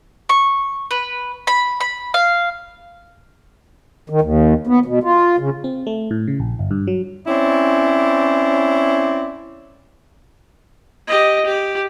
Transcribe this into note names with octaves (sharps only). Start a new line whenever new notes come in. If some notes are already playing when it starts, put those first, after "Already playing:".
C#6
B4
B5
B5
F5
D#3
D#2
B3
B2
F4
C#3
C4
A3
A2
C#3
A#1
G1
G2
F#3
C4 C#4 E4 C#5 D5
G4 D#5
G4